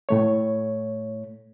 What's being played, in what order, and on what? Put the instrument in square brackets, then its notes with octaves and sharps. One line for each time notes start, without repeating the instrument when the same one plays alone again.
[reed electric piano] A2 A3 C#5